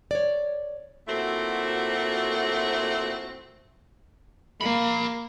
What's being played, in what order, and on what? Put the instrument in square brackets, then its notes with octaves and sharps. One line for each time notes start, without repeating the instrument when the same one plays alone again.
[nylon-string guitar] C#5 D5
[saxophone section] A#2 F#3 A3 C4 E4 F#4
[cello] A#3 [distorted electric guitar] F5 B5